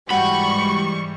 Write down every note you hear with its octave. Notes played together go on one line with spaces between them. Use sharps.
G#2 E3 G3 F#4 G5 B5 C#6